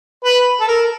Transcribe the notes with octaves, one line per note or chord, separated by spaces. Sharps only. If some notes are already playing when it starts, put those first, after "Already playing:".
B4
A4
A#4